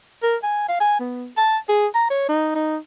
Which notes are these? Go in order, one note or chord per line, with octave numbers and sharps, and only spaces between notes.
A#4
G#5
F5
G#5
B3
A5
G#4
A#5
C#5
D#4
D#4